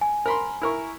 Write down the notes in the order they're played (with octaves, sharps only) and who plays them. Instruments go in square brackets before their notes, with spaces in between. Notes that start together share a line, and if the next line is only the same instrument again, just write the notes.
[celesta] G#5
[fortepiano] A#4 B5 C6
E4 A#4 C#6